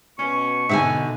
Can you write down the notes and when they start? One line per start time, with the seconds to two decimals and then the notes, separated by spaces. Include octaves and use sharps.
0.19 B2 C#4 C#6
0.69 B2 D3 D#4 E5 G#5